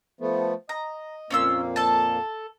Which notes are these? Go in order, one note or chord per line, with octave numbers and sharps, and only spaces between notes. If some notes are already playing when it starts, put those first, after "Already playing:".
F3 A3 B3
D#5 A#5
F2 A#2 A#3 C#4 F4 E6
A4 A5